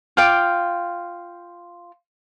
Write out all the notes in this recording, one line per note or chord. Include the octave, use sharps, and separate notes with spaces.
F4 F5 G5 D6